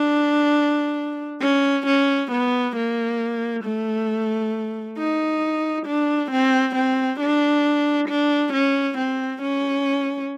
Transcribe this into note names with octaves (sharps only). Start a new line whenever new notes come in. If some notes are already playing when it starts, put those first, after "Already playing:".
Already playing: D4
C#4
C#4
B3
A#3
A3
D#4
D4
C4
C4
D4
D4
C#4
C4
C#4